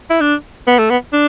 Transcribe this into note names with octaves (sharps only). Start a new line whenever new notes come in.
E4
D4
B3
A3
B3
D4